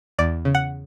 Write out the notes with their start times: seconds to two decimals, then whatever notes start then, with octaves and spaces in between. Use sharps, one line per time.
0.18 E2 D5
0.45 C#3
0.55 F#5